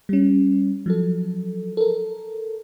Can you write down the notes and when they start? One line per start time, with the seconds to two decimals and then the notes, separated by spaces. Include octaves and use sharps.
0.09 G3 C#4
0.86 F3 F#3 A4
1.77 A4 A#4